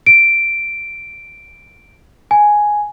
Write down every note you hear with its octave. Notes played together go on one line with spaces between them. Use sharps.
D7
G#5